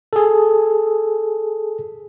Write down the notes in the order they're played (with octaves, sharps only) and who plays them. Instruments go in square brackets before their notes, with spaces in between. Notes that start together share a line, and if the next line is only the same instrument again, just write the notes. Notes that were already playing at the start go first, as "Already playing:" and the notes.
[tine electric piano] G#4 A4